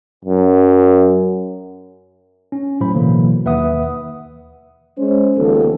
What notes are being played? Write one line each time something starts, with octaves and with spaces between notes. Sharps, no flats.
F#2
C#4
A2 F#3 C5 B5
B2 D3 E3 F#3 A#3
D#2 B4 E5 F#5 D#6
G#3 C#4 C5
D#2 C#3 F3 B3 A4